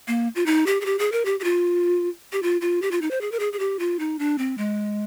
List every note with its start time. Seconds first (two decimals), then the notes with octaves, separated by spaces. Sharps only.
0.08 A#3
0.36 F4
0.46 D#4
0.66 G4
0.81 G#4
0.85 G4
0.99 G#4
1.12 A#4
1.25 G4
1.40 G4
1.44 F4
2.33 G4
2.43 F4
2.61 F4
2.82 G4
2.91 F4
3.02 D#4
3.11 C5
3.21 G#4
3.32 A#4
3.39 G#4
3.53 G#4
3.59 G4
3.79 F4
3.99 D#4
4.19 D4
4.38 C4
4.58 G#3